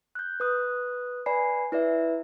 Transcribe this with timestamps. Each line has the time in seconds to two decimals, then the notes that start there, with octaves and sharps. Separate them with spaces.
0.15 F#6 G6
0.40 B4 D#6 F#6
1.26 B4 D5 G#5 B5 C7
1.72 E4 B4 D5 E5